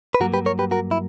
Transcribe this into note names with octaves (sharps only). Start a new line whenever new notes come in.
B4
G2 F#3 A#3 F#4 A#4
G4 B4
A#4 C#5
G4 B4
F#4 A#4
E4